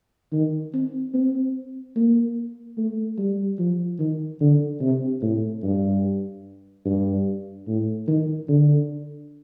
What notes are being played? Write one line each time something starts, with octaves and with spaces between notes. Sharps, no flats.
D#3
C4
C4
A#3
A3
G3
F3
D#3
D3
C3
A2
G2
G2
A2
D#3
D3